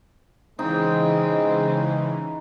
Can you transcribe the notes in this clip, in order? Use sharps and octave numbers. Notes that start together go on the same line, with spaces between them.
C#3 E3 G#3 C4 D#4